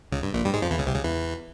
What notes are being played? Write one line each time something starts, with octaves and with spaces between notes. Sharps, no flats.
C#2 C#3
G2
A#1 A#2
G2 G3
G#2 G#3
F2 F3
E2 E3
C#2 C#3
C2 C3
C#2 C#3
E2 E3